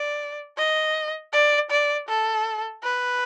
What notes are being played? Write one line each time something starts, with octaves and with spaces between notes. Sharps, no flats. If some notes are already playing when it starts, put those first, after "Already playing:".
Already playing: D5
D#5
D5
D5
A4
B4